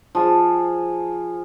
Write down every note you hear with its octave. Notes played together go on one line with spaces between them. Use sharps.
F3 G#4 A5